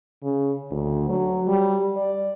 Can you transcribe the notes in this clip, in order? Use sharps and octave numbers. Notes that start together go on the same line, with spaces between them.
C#3
D2
F#3
G3
D5